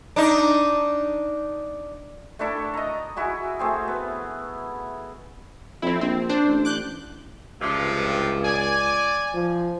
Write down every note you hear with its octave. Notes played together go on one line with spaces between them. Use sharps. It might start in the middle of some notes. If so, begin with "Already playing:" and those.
D4 D#4
A3 D4 E4 A4
D#5 A#5
E4 F#4 G#4
A3 C4 G#4
B3
F2 C4 E4
A#1 C4
D4 C5
A1
D6 F#6 G6
C#2 G2 C3 F3
D5 G#5
F3